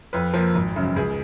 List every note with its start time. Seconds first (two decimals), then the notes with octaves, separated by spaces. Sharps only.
0.13 F2 B4
0.34 F3 A#3
0.55 G#1
0.76 F#2 C#3
0.96 C#2 G#4